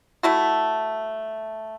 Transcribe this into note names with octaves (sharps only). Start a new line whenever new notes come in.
A3 E4 F#4